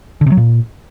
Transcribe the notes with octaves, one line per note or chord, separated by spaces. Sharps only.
D3
C3
F#3
A#2